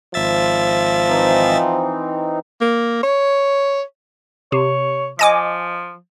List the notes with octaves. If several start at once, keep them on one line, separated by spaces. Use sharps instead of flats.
G#1 F3 E5 A6
E3 C4 D#4
A#3
C#5
C3 C#5
F3 D#5 G#5 D6